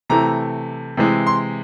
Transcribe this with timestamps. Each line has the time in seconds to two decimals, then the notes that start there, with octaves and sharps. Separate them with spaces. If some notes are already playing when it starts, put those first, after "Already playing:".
0.10 C3 E3 A3 A#5
0.97 C3 E3 G#3
1.27 C6